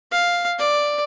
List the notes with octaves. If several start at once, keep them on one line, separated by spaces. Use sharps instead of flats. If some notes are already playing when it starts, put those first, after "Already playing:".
F5
D5